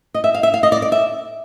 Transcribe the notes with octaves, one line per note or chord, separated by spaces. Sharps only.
D#5
E5
F5
E5
F5
D#5
D5
D5
E5